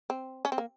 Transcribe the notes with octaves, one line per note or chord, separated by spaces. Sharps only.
C4
C#4
C4
A#3